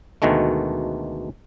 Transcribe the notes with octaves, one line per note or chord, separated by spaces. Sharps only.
D2 B2 D#3 G#3 A3